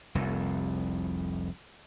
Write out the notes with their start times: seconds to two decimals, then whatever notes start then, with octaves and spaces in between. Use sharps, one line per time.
0.15 F1 C2 F2